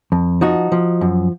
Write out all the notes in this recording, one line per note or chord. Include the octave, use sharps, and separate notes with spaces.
F2
F3 D#4 F#4
F3
F#2